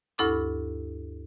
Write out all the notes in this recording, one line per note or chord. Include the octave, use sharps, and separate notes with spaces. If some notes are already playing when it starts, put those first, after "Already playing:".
D2 G2 E4 A4 C#6 D6